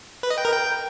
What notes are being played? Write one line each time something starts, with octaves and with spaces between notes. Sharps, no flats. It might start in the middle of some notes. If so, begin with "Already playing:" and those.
B4
D#5
G5
A#4
G5